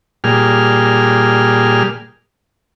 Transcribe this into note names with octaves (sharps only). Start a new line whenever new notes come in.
A#2 G3 G#4 F6